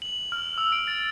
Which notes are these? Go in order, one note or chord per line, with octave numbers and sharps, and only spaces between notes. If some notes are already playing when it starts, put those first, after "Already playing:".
F#7
F6
E6
D7
A6